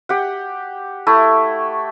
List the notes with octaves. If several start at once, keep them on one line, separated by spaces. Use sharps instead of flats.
G4 F#5
A3 E4